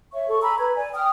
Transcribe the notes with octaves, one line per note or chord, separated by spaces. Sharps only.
C#5 E5 C#6
A4 C#6
G#5 A#5 B5 E6
B4 A#5 B5 G#6
D5 G#5
G5 D#6 F6